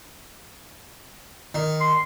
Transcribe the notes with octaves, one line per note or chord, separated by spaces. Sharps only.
D#3
C6